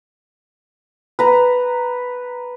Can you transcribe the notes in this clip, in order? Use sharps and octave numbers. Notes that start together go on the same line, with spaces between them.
B4 A#5